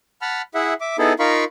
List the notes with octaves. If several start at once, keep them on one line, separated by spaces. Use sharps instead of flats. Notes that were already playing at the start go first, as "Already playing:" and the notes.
F#5 A5 B5 F6
E4 G#4 E5 F#5
E5 D6
B3 D#4 E4 G#4 A4
D#4 F4 A#4 F5 B5 C#6